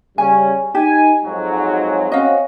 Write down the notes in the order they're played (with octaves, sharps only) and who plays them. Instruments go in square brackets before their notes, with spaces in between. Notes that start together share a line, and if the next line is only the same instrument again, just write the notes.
[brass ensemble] C#3 G3 C#4 [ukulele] G#5
[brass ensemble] D#4 G#5 [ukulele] G4
[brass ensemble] F2 G#2 F#3
[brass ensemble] C4 C#4 F#4 [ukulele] D#5 F5